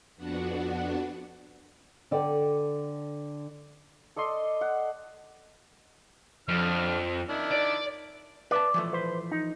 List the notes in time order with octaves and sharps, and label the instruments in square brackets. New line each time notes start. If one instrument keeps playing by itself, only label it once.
[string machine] F2 B3 D4 F#4 F#5
[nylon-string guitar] D3 A4 D5 F#5 G5
[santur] A4 D5 D#5 C6
F#5
[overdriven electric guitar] F2 [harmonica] D3 F6
[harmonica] D#3 D4 E4
[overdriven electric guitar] D5
[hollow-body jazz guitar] B4 E5 A5 [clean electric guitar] D5
[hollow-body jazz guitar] E3 F3 A3
[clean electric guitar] B4 C5
D#4